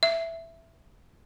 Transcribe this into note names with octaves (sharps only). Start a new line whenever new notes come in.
E5